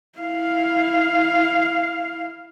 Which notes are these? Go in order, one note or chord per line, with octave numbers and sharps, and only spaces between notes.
E4 F5